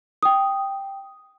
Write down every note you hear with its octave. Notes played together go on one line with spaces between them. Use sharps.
G5 D#6